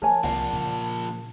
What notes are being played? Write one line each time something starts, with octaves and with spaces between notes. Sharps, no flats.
F3 A#4 C#5 G#5 A5
C2 F3 A#3 D5 F5 F#5
A#2 C#3